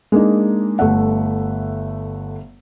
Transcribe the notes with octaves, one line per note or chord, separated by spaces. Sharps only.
G#3 A#3 D4 D#4
G1 A3 E5 F#5